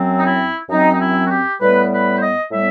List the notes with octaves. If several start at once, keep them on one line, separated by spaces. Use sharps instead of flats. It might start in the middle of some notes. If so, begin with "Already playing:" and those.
Already playing: F#2 F#3 C4
D#4
E4
F#2 F#3 C4 D#4
D#4
E4
F#4
G4
A2 G3 B3 B4
B4
C5
D#5
A2 G3 B3 E5